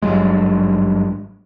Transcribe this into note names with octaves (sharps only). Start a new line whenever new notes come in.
G#1 G2 F#3 G#3